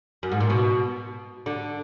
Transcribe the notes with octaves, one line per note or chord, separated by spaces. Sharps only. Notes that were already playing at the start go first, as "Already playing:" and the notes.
F#2
G#2
A#2
B2
D3